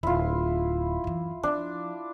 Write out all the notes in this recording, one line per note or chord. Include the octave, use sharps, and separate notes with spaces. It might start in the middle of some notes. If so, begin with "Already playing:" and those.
D1 E4 F4
F#2 E3
F3 D4